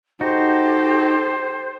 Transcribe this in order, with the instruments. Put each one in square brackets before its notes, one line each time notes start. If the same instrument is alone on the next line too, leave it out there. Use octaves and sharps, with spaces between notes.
[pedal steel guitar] D#4 F#4 [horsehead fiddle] G4 A4 [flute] C5